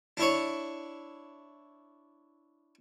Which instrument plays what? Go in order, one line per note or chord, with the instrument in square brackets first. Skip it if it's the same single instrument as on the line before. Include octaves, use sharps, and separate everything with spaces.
[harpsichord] D4 E4 C#5